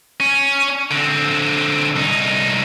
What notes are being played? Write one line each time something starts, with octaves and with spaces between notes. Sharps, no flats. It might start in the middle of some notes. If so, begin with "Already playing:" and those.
C#4
D3 C4
C2 D#4